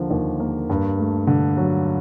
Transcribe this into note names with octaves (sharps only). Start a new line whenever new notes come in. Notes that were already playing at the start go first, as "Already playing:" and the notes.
Already playing: D#2 D3 F3 A#3
D#2
A#3
G2
A3
D3
F#3